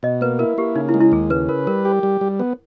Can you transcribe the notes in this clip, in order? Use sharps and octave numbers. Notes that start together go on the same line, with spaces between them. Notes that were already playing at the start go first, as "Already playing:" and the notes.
B2 D#5
A#3 B4
E4 A#4
A#3 G4
C#3 D#4
E4
G#3
E4
D#2 G#4
C#3 B4
A#4 B4
G3 A#4
G4
G3
G3
B3